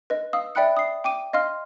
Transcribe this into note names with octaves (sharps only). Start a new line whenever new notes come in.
B4 D#5
F5 D#6 E6
D5 E5 G5 B5 F#6 C#7
D#6 C7
G5 D6 D#7
D#5 F5 C6 F6